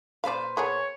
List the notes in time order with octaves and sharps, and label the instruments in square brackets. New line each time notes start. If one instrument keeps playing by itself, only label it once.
[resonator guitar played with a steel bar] A#2 B4 C5 [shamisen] D5 F5
[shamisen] B3 G#4 A#4 [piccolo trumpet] C#5